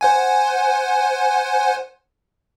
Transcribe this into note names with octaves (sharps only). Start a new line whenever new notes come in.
C5 F#5 G#5